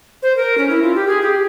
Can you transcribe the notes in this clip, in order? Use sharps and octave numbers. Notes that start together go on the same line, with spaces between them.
C5
A#4
C#4
E4
F4
G4
G#4
G4